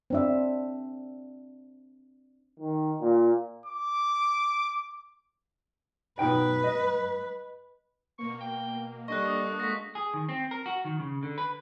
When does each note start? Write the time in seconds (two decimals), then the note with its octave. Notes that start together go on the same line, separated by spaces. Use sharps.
0.10 C4 D4 E5
2.60 D#3
3.02 A#2
3.66 D6
6.19 B2 D#4 B4 G5
6.64 D#5
8.19 B2 A#3 C#6
8.41 G5
9.08 G3 A#3 D4 A4 D#5 C#6 F#6
9.22 C#6 D#6
9.60 G#3 F#4 A#6 B6
9.95 G#4
10.14 D#3
10.29 C4
10.51 A#4
10.66 F#4
10.85 D#3
11.00 C#3
11.23 D3
11.38 B4